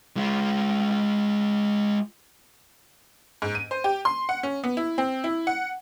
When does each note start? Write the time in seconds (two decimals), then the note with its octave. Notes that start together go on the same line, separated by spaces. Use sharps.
0.17 G#3 F4
3.42 G#2
3.55 D#7
3.71 C5
3.84 G4
4.05 C6
4.29 F#5
4.43 C#4
4.64 B3
4.77 E4
4.98 C4
5.24 E4
5.47 F#5